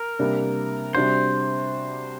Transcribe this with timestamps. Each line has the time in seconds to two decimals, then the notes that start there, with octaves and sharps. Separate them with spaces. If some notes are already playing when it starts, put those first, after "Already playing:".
Already playing: A#4
0.19 C3 G3 A#3 D4
0.95 C3 G3 D4 F#4 C5